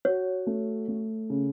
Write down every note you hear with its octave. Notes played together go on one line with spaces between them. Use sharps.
F#4 C#5
A3
A3
C#3